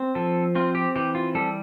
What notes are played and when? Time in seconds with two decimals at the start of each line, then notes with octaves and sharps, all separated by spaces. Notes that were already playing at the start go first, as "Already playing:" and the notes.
Already playing: C4
0.15 F3 A4
0.55 C4 F4
0.75 G4
0.96 E3 G4
1.15 F4
1.35 G3 A4